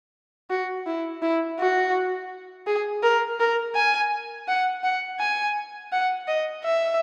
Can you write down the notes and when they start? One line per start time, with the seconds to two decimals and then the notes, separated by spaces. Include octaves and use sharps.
0.50 F#4
0.86 E4
1.22 E4
1.59 F#4
2.67 G#4
3.03 A#4
3.40 A#4
3.75 G#5
4.48 F#5
4.84 F#5
5.20 G#5
5.92 F#5
6.28 D#5
6.64 E5